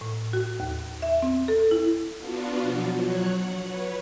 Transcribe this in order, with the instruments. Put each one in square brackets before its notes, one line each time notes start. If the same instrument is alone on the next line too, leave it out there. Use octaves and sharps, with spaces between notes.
[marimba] A2
F#4
D#2
E5
C4
A4
E4
[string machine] B3 D4 F4 F#4
B2 F3 F#3
F#3 C#5 F#6
F#5
B4 C#5